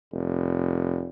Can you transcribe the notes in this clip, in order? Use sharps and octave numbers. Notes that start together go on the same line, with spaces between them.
F1